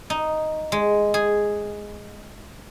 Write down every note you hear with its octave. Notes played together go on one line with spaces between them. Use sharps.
D#4
G#3
G#4